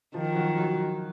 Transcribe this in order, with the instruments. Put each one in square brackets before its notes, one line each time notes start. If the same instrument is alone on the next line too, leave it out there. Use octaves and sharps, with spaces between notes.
[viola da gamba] D#3 [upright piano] F3 F4
[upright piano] F#3 F#4
F#3 F#4